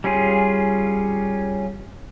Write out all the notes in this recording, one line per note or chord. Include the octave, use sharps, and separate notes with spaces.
G3 C#4 F4 G#4